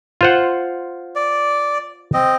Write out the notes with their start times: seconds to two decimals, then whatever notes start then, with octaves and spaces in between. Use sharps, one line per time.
0.21 F4 C5 F#5
1.15 D5
2.14 C4 D#5